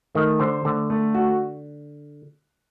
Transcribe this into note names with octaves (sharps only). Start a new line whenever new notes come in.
D#3 A3
D3 C5
D3 A3
A3
F#4